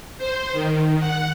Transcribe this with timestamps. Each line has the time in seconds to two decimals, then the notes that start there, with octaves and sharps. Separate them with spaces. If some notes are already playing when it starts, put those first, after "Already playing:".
0.18 C5
0.53 D#3
0.99 F#5